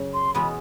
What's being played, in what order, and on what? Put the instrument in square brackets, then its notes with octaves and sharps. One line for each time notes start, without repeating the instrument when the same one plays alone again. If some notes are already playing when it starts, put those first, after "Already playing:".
Already playing: [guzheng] F#2 C#3
[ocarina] C6
[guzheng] E2 B2 G#3 [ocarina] B5